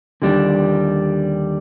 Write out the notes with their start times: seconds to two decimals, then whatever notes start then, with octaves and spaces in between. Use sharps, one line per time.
0.22 D#2 D3 G3 D4